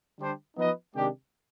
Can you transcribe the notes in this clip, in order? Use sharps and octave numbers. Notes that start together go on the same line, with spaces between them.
D3 G3 D4 G4 C5
F3 B3 D#4 B4 D#5
C3 D#3 G#3 D4 G4